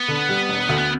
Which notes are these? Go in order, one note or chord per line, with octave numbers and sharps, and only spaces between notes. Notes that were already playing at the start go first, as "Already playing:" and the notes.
Already playing: B3
D3
G3
E1
D2
B3